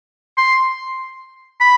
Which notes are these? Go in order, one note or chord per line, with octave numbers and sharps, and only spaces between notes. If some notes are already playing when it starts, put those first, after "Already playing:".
C6
B5